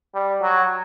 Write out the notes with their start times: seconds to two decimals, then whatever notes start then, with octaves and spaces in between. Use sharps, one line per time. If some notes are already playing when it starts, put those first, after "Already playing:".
0.14 G3
0.42 F#3